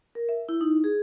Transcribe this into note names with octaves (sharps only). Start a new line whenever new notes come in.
A#4
E5
E4
D#4
G#4